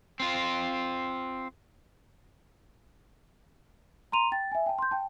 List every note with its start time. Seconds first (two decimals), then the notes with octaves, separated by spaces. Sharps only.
0.20 C4 F4
4.12 A#5 C6 D#7 F7
4.32 G5 A6
4.52 E5 G#5
4.66 G5 A5
4.79 C6 G6
4.91 G5 A5